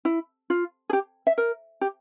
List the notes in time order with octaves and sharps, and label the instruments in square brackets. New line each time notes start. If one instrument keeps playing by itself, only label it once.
[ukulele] E4
F4
G#4
G4
E5
A#4
G4